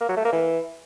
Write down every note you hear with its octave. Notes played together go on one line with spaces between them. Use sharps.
A#3
F#3
A3
A#3
E3